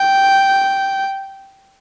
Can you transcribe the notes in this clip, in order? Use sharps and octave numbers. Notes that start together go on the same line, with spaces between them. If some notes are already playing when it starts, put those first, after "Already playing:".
Already playing: G5